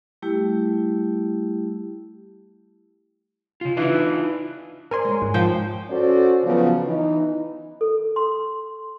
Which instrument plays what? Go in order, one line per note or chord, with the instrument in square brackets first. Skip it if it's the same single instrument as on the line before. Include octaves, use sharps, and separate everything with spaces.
[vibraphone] G3 A3 E4 G4
[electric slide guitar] C#3 F4
[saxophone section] E3 [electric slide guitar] D4 D#4 F4
[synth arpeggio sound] A#4 G#5 C6 [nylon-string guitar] C5 D5
[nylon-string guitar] G#3 C#5
[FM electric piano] G#2
[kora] F3 C5 G5
[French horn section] C#4 F#4 A4 C5 D5
C#3 F3 F#3 B3
E3 D#4
[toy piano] A4
C6